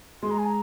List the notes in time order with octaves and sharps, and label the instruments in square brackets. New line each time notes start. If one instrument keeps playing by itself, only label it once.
[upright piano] G#3 [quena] C6
[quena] A#5
G#5
A#5